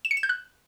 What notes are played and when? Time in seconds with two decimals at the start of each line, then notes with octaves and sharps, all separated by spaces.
0.05 E7
0.11 C#7
0.17 E7
0.23 G6
0.29 F#6